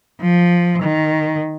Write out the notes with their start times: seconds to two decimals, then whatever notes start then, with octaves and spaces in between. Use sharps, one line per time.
0.21 F3
0.83 D#3